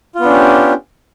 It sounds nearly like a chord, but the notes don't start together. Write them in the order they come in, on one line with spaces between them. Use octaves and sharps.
F4 B3 D4 C#4 G4